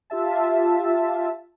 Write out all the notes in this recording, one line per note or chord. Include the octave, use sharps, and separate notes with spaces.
F4 G4 E5 A5